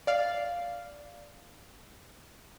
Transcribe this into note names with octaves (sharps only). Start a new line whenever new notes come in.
D5 F5